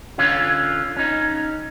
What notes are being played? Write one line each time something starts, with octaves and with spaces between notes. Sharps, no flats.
D3 C#4 F4
C#4 D#4